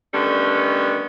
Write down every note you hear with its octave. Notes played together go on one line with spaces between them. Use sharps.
D3 D#3 G3 A3 B3 C#4